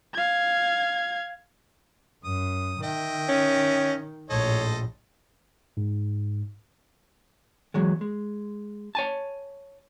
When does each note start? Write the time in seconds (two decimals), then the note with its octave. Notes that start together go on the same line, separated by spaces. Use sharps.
0.14 F5 G#6
2.24 F#2 D#6
2.83 D#3 D#5 E5 G5
3.28 C#4
4.30 A#1 A2 A4 C5 C#5 D#5
5.77 G#2
7.74 E2 F#3 G#3
8.01 G#3
8.95 C#5 G#5 A5